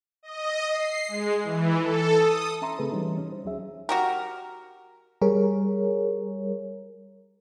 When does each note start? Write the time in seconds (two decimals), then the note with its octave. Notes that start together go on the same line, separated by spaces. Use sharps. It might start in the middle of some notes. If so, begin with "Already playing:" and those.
0.23 D#5
0.69 C7
1.08 G#3
1.43 E3
1.80 A4
2.15 D#6
2.62 C#4 E5 A#5 C6
2.79 C#3 A3 C4 G#4 A4 B4
2.92 E3 G3 C#4 D#4
3.18 C#4
3.32 C5
3.44 D2 F#3 C#4 G#4 E5
3.89 F#4 G4 A#4
5.22 G3 G#4 A#4 C#5